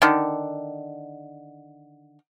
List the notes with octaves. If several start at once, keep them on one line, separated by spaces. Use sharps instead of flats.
D3 D#3